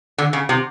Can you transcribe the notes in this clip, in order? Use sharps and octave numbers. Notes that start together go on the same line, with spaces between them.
D3
C#3
C3